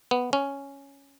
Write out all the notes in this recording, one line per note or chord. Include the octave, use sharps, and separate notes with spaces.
B3
C#4